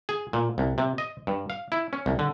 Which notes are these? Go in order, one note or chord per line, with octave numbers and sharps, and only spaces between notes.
G#4
A#2
C2
C3
D#5
G2
F5
E4
C#4
C2
D3